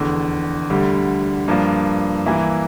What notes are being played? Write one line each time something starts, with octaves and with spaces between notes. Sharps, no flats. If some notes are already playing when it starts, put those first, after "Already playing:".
Already playing: F1 E2 D3
D2 D3 G3
G2 F3 A#3 D4
G2 E3 A#3 E4